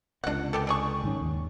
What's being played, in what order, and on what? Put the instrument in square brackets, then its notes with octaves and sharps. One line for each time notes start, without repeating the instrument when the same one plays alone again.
[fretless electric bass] C#2 C3 [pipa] D4 F#5
[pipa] B3 G4 A4
D4 G#4 C#6
[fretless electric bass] G#2 D#3 C#4
D#2